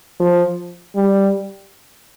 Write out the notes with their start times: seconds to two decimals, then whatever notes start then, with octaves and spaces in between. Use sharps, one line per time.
0.20 F3
0.95 G3